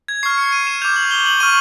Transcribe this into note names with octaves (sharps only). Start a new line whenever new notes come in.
G#6
C#6 F6 C7
C#7
D#7
E7
D6 G6 F7
F#7
G7
F#7
C#6 F6 D#7